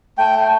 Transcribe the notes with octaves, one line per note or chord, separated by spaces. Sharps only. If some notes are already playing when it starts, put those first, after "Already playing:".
A3 G5